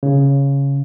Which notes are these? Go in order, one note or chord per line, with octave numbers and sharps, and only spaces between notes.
C#3